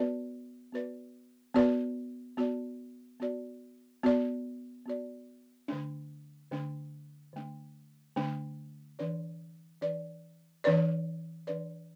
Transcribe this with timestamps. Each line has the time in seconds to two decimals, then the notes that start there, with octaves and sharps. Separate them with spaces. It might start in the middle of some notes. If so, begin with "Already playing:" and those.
Already playing: B3 F#4 B4 D5
0.72 B3 F#4 B4 D5
1.54 B3 F#4 B4 D5
2.37 B3 F#4 D5
3.20 B3 F#4 D5
4.03 B3 F#4 D5
4.86 B3 F#4 D5
5.68 D3 A3 D4
6.51 D3 A3 D4
7.33 D3 A3 D4
8.16 D3 A3 D4
8.99 E3 D4 B4 D5
9.81 E3 D4 B4 D5
10.64 E3 D4 B4 D5
11.47 E3 D4 B4 D5